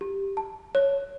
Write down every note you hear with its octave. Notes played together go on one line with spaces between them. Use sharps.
G4
A5
C#5